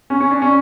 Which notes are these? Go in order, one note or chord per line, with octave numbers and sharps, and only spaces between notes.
C#4
C#4
D4
C#4